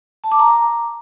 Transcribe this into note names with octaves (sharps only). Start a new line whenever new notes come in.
A5
D6
A#5